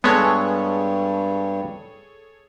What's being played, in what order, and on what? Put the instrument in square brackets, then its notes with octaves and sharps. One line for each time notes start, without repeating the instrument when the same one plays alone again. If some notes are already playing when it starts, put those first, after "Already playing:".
[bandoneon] G2 G3 [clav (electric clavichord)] G#3 B3 [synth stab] G#4 A4 C#5